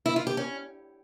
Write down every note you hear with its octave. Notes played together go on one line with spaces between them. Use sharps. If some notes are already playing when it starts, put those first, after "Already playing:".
E4
F4
G4
C#4